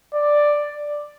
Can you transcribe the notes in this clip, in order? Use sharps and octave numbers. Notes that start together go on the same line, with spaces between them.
D5